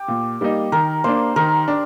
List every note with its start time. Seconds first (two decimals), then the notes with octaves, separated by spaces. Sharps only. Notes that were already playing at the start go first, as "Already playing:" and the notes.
Already playing: G4
0.08 A#2
0.41 G3 A#3 D#4
0.72 D#3 A#4
1.04 A#3 D4 C5
1.36 D#3 A#4
1.68 D4